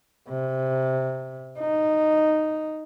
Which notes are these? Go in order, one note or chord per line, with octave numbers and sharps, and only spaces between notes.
C3
D#4